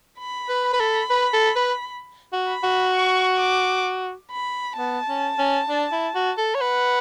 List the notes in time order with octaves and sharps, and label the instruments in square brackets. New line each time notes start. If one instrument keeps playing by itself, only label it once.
[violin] B5
[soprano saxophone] B4
[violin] B5
[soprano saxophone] B4
A4
B4
A4
B4
F#4
[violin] B5
[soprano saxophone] F#4
[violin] C#6
D6
B5
[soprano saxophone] B3 [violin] A5
[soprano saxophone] C#4
C#4
D4
E4
F#4
A4
C#5
[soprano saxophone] B4 [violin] F#5